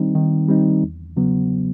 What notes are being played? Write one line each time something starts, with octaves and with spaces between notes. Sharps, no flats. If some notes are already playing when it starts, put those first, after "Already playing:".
Already playing: D#3 G3 C4 D#4
D#3
G3 C4 D#4
E2
C#3 F#3 B3